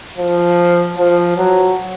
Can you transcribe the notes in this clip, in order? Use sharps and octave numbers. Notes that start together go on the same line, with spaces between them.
F3
F3
F#3